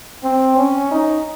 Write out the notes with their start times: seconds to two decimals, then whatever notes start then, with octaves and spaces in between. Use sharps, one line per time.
0.23 C4
0.57 C#4
0.91 D#4